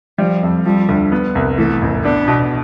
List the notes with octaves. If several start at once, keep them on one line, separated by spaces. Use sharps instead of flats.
F3 G3
F2
F3 G3
D2
B3
C2
E3 A3
A1
B3 D4
B2